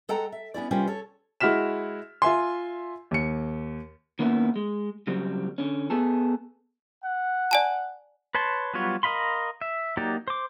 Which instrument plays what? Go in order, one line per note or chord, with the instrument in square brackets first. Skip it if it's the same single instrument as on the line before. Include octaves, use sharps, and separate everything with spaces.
[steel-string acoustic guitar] G#3 A4 F#5 G5 A#5
E5
B3 C#4 E4 D5
C3 G3 C#4 F4 A#4 C5
A4 C#5
[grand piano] G#3 E4 F#4 F6 B6 E7
F4 E5 G#5 C6
D#2 C#7
[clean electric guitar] D#3 A#3 B3 C#4 E4
G#3
C#3 F#3 G3 C4
D3 C#4
B3 G#4 A4
[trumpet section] F#5
[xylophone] D5 G#5 A5
[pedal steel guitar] B4 C#5 A5 C6
F#3 G3 B3 F4 C#5
A#4 D#5 F5 B5 C6
E5
F#3 A#3 D#4 G4 D5
C5 D6